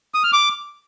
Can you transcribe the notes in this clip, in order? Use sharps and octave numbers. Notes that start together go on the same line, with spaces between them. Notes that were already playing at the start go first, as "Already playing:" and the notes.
D#6
F6
D6